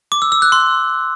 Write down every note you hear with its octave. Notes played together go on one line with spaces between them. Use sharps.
D6
E6
E6
F#6
C6